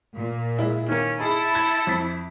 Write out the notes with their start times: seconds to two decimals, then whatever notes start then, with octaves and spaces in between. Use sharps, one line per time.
0.17 A#2
0.59 G#3 E4
0.89 D#3 A#3 C#4
1.20 D#4 E4 G#4 A4
1.55 G#6
1.87 F2 B6